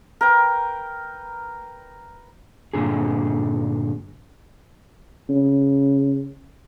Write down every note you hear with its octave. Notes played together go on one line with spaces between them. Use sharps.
A#4 B4 G5
G2 A#2 D3 G#4
C#3